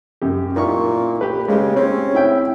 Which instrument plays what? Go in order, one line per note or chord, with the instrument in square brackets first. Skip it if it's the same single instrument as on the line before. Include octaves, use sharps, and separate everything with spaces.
[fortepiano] F#2 G4
[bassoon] A#2 [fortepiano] D#4 E4 C#6
[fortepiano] G4 B4
[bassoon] C#3 [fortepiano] G#3 G4
[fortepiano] C4 [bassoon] C#4
[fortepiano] E4 E5 G5